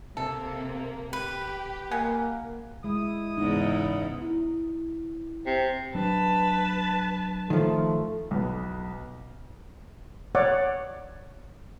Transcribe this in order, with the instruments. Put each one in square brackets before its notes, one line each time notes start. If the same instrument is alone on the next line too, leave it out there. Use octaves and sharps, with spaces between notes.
[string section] C3 A#3 [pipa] A4
[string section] G4 [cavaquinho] B4
[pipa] G#3 F#5 G#5 [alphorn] A#3
[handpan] G#3 [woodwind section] E4 D#6
[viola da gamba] E2 G#2 C#3 [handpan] D#4
[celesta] E4
[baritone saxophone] C3
[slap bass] F#3 D4 [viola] B4 A5
[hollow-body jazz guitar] D#3 F3 [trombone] A3
[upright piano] B1 B3
[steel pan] C#5 D5 F#5